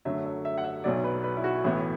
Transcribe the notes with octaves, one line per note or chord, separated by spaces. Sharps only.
F#2 D3 F#3 A3 E5
E5
E5
F#5
E5
B1 B2 F#3 D5
B4
B4
E4
F#4
A1 A2 E3 B3 E4